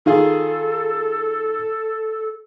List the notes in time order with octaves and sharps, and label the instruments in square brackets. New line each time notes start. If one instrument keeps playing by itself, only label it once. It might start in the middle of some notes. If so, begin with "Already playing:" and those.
[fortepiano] D#3 F4 G#4 [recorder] A4